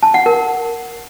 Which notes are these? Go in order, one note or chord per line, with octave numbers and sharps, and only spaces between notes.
A5
F#5
A#4